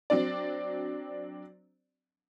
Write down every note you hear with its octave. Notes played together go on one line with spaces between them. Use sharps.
F#3 C4 D4 D5